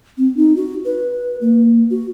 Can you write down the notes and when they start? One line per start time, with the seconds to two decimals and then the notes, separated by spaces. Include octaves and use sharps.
0.18 C4
0.37 D#4
0.56 F#4
0.85 B4
1.41 A#3
1.91 F#4